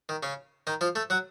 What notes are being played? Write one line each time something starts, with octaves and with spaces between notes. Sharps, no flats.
D#3
C#3 C#4
D#3 D#4
F3 F4
A3 A4
F#3 F#4